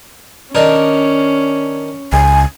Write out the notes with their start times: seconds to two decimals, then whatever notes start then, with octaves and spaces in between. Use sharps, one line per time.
0.55 D#3 C#4 D4 A#4
2.13 C#2 G#5